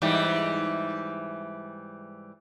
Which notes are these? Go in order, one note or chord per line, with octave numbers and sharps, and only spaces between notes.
G#2 E3 G3